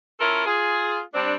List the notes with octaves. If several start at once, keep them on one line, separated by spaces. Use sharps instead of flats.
C#4 E4 F4 A4 A#4
F4 G#4
G3 C4 D4